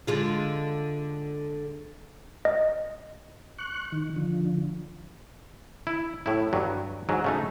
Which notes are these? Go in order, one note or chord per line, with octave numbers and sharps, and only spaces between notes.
D3 G#3 F4
D#5
C#6 F#6
D#3
D3 F3
E4
A2 E4
G2 F#3
G#2 F#3
C#3 A3 D#4